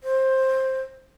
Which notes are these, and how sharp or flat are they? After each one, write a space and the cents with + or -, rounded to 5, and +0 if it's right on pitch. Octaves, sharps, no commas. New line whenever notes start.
C5 +15